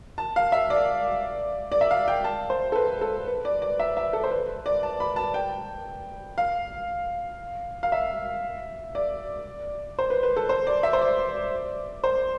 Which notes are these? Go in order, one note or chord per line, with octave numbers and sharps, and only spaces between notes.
A5
F5
E5
D5
D5
E5
F5
G5
A5
C5
A4
B4
A4
B4
D5
D5
E5
E5
A4
C5
B4
D5
A5
B5
A5
G5
F5
F5
E5
D5
C5
B4
B4
A4
C5
D5
E5
C5
D5
C5